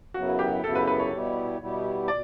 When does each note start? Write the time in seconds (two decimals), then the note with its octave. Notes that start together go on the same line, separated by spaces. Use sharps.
0.14 F#2 C#3 F#3 B3 E4 F#4
0.39 G4
0.63 F#2 C#3 F#3 B3 E4 A4
0.75 B4
0.87 B4
1.00 C#5
1.12 B2 G3 B3 E4 G4
1.60 B2 G3 B3 E4 G4
2.08 B2 D5